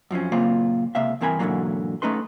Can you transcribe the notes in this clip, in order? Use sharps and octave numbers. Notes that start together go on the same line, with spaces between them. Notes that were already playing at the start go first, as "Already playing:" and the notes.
F#2 F3 C4 C#4
F#2 A#2 C#3 A#3 C4 F4
C#2 C3 A#3 E5 F5
G2 E3 C4 A#4 G#5 B5
G#2 B2 D3 E3 F#3 A#3
A3 C#4 D#4 B4 C6